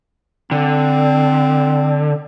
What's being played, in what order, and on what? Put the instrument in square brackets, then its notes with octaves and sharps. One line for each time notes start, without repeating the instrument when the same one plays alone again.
[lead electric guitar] D3 [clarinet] C4